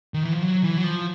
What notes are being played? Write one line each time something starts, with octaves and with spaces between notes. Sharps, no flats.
D#3
E3
F3
F#3
E3
F#3
F3